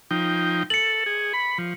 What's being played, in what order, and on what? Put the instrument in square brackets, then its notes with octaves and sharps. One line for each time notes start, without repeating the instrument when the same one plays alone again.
[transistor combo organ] F3 D#4 G5
[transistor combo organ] A4 [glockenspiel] C#7 F#7
[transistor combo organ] G#4
B5
F3